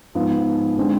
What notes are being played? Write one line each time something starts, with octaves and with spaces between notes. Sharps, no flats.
G#2 F3 B3
D3 G#3 C4